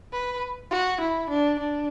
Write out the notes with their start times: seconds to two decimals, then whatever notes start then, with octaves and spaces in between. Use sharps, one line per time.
0.12 B4
0.71 F#4
1.00 E4
1.29 D4
1.59 D4